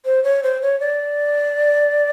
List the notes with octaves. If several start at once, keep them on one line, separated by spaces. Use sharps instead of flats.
C5
C#5
C5
C#5
D5